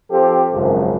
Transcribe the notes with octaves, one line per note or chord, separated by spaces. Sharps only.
F3 C4 G4 A4
G#1 C#2 F#2 F3